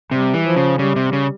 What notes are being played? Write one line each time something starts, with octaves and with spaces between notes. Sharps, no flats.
C3 G3
E3
F3
C#3
C#3 G3
C3
C#3